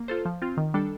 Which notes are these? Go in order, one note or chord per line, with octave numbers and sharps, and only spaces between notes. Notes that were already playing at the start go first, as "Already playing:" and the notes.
Already playing: A#3
F4 A4 C5
F3
C4 F4
D#3
G3 D4 A4